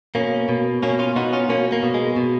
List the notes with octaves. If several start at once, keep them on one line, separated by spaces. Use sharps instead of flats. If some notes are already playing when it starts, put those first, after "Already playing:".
B2 A#3 C#4
B2
B2 A#3 C#4
C#4 F4
B2 D#4 F#4
C#4 F4
B2 A#3 C#4
A#3
B2
G#3
B2